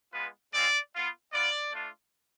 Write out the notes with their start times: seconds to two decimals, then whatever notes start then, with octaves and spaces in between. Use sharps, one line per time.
0.13 G#3 B3 F4 B4
0.53 G#3 C4 F4 D5
0.94 B3 F4
1.33 B3 F4 D5
1.73 A3 D4 F4